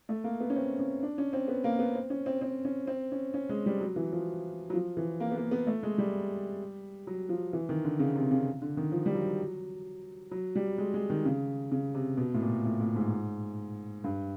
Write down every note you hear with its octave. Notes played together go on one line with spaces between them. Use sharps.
A3
A#3
B3
C#4
C4
C#4
D4
C#4
C4
B3
A#3
B3
C4
C#4
C4
C4
C#4
C4
C#4
C#4
G#3
G3
F#3
E3
F3
F#3
F3
E3
A#3
B3
A#3
B3
A3
G#3
G3
F#3
F3
E3
D#3
D3
C#3
C3
C#3
D3
D#3
F3
G3
F#3
F#3
G3
G#3
G#3
D#3
C#3
C#3
C3
B2
A2
A#2
A2
A2
G#2
G2